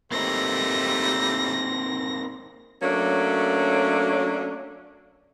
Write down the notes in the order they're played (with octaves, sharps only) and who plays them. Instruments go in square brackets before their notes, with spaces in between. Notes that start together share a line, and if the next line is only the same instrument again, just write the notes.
[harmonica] G3 A3 [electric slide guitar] A#3 C4 D#4 [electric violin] A#6
[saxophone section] F#3 A3 A#3 C#4 D4